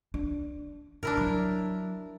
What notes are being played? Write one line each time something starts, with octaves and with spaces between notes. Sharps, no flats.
D4
D3 D4 E4 A#4
F#3